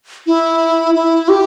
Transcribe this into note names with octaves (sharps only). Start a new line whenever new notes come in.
E4
E4
G4